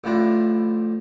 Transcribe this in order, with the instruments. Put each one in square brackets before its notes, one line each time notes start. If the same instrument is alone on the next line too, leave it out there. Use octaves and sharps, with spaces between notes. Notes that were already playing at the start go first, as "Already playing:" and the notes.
[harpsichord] A1 A2 F3 D4